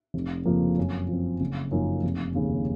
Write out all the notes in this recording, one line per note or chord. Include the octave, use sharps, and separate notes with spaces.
F1
F2 C#3 F3 A#3
F#2
F3 C4
F#1
F#2 F3 A#3 D#4
F1
D#2 C#3